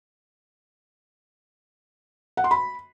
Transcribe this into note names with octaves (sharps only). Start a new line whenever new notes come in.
F#5
C6
B5